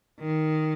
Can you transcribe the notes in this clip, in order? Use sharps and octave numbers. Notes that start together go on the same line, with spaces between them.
D#3